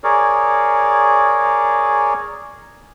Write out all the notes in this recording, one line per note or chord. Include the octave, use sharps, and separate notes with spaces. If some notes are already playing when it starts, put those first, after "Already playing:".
G#4 A#4 C#5 D5